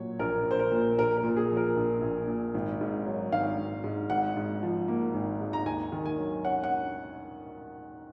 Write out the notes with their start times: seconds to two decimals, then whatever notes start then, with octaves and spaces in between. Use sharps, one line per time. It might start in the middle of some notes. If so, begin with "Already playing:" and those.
Already playing: A#2 F#3 C#5
0.19 A#1 A#4
0.46 A#1 C5
0.59 A#4
0.72 A#2
0.98 A#1 A#4
1.17 A#4
1.23 A#2
1.37 G#4
1.51 F3
1.57 A#4
1.76 A#1
2.02 A#1
2.28 A#2
2.54 G#1
2.81 G#2
3.07 F#3
3.32 G#1 F5
3.58 G#1
3.84 G#2
4.10 G#1 F#5
4.37 G#2
4.63 F3
4.88 A#3
5.14 G#1
5.41 G#2
5.53 A#5
5.66 D#2 G#5
5.92 D#3
6.06 G#5
6.18 F#3
6.45 C#4 F#5
6.64 F#5